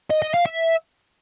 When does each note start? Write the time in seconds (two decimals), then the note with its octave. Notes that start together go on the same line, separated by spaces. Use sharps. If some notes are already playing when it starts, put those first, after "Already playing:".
0.10 D#5
0.22 D#5
0.34 F5
0.46 E5